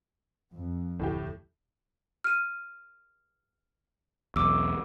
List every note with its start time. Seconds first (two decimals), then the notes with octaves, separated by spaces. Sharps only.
0.53 F2
0.99 E1 D2 A2 G4
2.24 F6 D#7
4.36 B1 E2 D6 E6